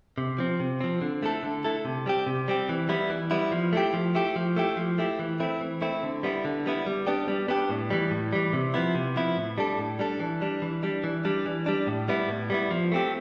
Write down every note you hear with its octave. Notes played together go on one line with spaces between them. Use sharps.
C3
F3 C4
C3
F3 C4
D3
A3 E4 A4
D3
A3 E4 A4
C3
G3 C4 G4
C3
G3 C4 G4
E3
G3 B3 E4
E3
G3 B3 E4
F3
A3 E4 G4
F3
A3 E4 G4
F3
A3 E4 G4
F3
A3 E4 G4
E3
A3 C4 E4
E3
A3 C4 E4
D3
G3 B3 E4
D3
G3 B3 E4
G3
B3 D4 G4
G3
B3 D4 G4
A2
E3 G3
A2
E3 G3
C3
F3 B3 E4
C3
F3 B3 E4
A2
G3 D4 A4
A2
G3 D4 A4
E3
G3 D4
E3
G3 D4
E3
G3 D4
E3
G3 D4
A2
G3 B3 E4
A2
G3 B3 E4
F3
A3 C4 G4